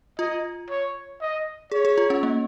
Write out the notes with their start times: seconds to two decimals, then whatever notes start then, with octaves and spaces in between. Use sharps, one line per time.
0.18 F4 D#5
0.70 C#5
1.21 D#5
1.72 G#4 C#5
1.85 G#4
1.98 F4
2.10 C#4
2.23 A#3